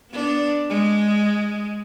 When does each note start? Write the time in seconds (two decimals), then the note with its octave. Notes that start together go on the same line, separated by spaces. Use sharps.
0.11 B3 D4
0.70 G#3